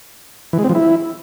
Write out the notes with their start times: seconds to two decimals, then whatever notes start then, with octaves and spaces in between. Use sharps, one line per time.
0.53 E3
0.59 G#3
0.64 C4
0.69 F3
0.75 E4